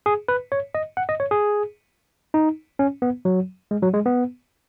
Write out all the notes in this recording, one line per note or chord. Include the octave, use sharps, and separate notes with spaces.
G#4
B4
C#5
D#5
F#5
D#5
C#5
G#4
D#4
C#4
B3
F#3
G#3
F#3
G#3
B3